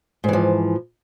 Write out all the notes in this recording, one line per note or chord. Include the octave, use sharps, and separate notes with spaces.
G#2 E3 F3